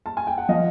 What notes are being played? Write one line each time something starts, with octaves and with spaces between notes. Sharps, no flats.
A5
G#5
G5
F#5
F3 D#5 F5